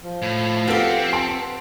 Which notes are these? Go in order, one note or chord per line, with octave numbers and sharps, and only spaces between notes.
F3
A2
B3 C4 F4 G4 A4
A5 C6 D7